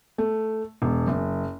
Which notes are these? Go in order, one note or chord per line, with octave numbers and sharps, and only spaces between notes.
A3
E1
F#1